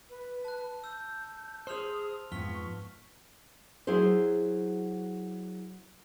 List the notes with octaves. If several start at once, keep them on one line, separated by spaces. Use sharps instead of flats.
B4
A5 F#6
E6 G6
G#4 C5 C6 D#6 F6 F7
F2 G#2 B3 C#6 F6 B6 G7
F#3 E4 G#4 C5